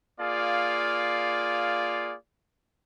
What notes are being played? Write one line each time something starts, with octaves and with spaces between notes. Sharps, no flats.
A#3 F4 G#4 D5 F5